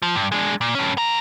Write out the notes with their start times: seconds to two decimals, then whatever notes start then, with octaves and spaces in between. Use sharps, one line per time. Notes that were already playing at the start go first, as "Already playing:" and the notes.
0.02 F3
0.16 G2
0.32 G#3 D4
0.61 A#2
0.75 G2 C#4
0.97 B3 A#5